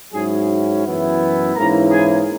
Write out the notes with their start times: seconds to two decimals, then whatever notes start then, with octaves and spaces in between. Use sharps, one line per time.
0.12 G#2 F#3 C#4 E4 G#4
0.84 F#2 E3 B3 E4
1.55 G#2 E3 A#3 C#4 E4 A#4 A#5
1.91 G#4 G#5